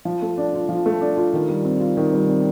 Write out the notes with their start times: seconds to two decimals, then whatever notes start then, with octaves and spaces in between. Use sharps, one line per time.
0.05 F3
0.22 A3
0.38 D4
0.54 F4
0.69 F3
0.86 A3
1.01 D4
1.17 F4
1.33 D#3
1.49 G3
1.64 C4
1.80 F4
1.97 D#3
2.13 G3
2.28 C4